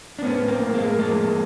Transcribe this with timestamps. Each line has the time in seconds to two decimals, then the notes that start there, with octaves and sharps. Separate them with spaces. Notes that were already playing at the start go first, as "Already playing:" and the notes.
0.19 D4
0.22 A2 B3 C#4
0.48 A#3 C4
0.61 A2
0.74 G#3 A#3
0.98 F3 G#3 A#3